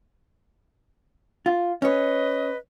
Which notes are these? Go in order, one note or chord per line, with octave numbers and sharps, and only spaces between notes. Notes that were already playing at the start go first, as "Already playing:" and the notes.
F4
C#4 B4 C#5 D#5